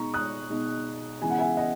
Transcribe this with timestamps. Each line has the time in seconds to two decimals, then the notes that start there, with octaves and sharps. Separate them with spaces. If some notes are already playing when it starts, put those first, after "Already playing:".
Already playing: B2 G#3 D#4 A#5 C#6
0.14 D#6 F#6
0.50 B2 G#3 D#4
1.21 C#3 E3 G#3 B3 E4 G#5
1.30 F#5
1.39 E5 G#5
1.57 D#5 F#5